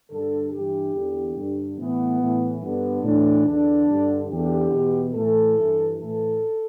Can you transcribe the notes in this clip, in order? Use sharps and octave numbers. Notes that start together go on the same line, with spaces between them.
G2 D3 A4
G2 E3 G4
E2 D3
G2 D3
A2 E3 B3
A2 E3
G2 D3 B3
A2 E3 D4
E2 D3 D4
G2 D3
E2 D3 G4
E2 B2
A2 E3 A4
G2 E3
A2 E3 A4